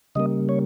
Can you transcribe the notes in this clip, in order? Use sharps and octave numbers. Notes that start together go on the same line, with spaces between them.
C#3 G3 A#3 D#5
C#5